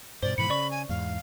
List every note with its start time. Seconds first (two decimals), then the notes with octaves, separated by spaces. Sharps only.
0.22 G2 B2 C5 D5 G7
0.38 G#2 B2 E3 B5 C#7 F#7
0.50 C#3 D5 C#6
0.71 G#5
0.89 E2 G#2 F5